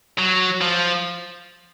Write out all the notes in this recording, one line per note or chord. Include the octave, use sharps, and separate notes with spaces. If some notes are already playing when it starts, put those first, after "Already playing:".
F#3
F3